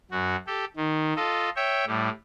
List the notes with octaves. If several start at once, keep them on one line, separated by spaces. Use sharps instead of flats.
F#2 F#4
G4 A4
D#3
F4 A4 D#5
C#5 E5 G5
A2 G3